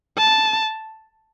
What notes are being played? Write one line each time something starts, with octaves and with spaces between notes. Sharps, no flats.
A5